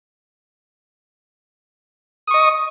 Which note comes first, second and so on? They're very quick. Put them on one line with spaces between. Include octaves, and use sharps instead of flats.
D#6 C#6 D#5